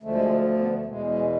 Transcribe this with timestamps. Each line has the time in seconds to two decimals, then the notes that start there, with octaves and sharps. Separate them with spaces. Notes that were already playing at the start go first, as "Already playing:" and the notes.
0.03 D2 D3 F3 G#3 A3
0.13 G#3
0.25 A3
0.44 A3
0.58 B3
0.71 A3
0.85 E2 B2 G#3
1.06 G#3